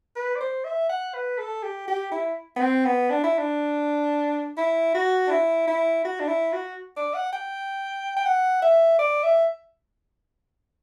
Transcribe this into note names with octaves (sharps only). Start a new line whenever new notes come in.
B4
D5
C5
E5
F#5
B4
A4
G4
G4
E4
B3
C4
B3
D4
E4
D4
E4
F#4
D4
E4
E4
F#4
D4
E4
F#4
D5
F#5
G5
G5
F#5
E5
D5
E5